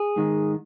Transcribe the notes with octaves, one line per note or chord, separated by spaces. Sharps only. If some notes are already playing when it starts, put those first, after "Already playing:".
Already playing: G#4
G#2 D#3 G#3